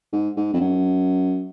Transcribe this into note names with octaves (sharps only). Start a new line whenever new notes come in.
G#2
G#2
F2
F#2